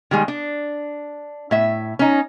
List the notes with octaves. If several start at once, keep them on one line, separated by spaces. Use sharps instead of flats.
D#3 G3 G#3
D4
A2 E5
C#4 D#4